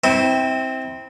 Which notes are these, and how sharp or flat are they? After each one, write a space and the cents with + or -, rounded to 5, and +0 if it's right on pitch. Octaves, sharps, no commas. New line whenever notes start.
C4 +0 E4 -30